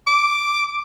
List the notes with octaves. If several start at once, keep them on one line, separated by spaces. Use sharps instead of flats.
D6